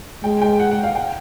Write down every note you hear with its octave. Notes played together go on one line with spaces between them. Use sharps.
G#3 G5
G5
F#5
F#5
F5
G5